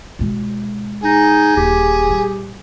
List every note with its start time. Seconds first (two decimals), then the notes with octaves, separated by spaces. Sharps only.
0.19 B2 G#3
1.04 D#4 G#4
1.57 D#1 G4
2.07 A#2 G3